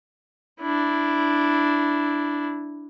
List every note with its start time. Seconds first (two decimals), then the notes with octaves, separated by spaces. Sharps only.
0.61 D4 E4